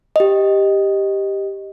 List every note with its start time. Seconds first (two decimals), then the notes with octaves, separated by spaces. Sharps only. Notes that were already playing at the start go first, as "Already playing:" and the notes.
0.16 G4 D#5